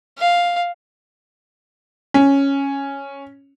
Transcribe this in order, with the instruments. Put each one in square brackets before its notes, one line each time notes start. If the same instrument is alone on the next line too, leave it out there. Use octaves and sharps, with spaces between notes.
[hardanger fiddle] F5
[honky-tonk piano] C#4